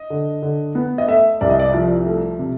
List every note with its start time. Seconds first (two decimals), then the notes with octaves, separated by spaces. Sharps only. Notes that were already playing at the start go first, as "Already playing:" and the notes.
Already playing: D#5
0.10 D3
0.42 D3
0.75 B3
0.98 D#5
1.08 A3 E5
1.41 C2 D5
1.50 D#5
1.60 D5
1.74 F3
2.06 A3
2.39 C3